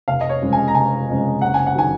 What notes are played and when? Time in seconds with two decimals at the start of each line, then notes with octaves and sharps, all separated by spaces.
0.08 F1 F5
0.21 D#5
0.29 C#5
0.42 F2 C#3 G#3
0.53 G#5
0.68 A#5
0.74 F1 G#5
1.09 F2 C#3 G#3
1.41 F#1 F#5
1.54 G#5
1.67 F#5
1.75 D#3 F#3 G#5